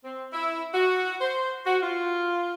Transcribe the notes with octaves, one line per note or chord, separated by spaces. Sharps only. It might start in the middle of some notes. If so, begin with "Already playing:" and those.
C4
E4
F#4
C5
F#4
F4